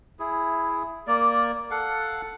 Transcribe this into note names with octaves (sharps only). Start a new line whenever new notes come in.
E4 G#4
A#3 D5
A4 F5 F#5